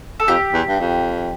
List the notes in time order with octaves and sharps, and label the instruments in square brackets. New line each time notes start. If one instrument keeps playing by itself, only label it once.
[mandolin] A4
[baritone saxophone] F2 [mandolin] G4
[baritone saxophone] E2
G2
F2